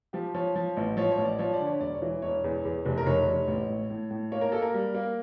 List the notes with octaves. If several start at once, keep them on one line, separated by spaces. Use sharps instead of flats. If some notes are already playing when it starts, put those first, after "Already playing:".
F3 G4
F3 C#5
F3
A1
F3 C#5
C#5
A1
D5
F3 C#5
D5
D3
C#5
E1 D5
C#5
E3
E1 C#5
E2
E2
F1
A#4
F1 C#5
F1
A1
A2
A2
A2
A#3 C#5
A#4
A#3 A4
A#4
G3
A#3